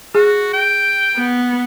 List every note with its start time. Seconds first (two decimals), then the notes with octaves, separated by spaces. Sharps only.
0.15 F#4 G#4
0.53 G5
1.16 B3